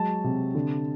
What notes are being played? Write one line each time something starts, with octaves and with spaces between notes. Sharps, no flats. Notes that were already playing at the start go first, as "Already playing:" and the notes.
Already playing: F#3 G#3 A5
C3
D3